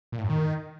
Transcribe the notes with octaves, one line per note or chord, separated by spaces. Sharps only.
A#2
A2
F#2
D#3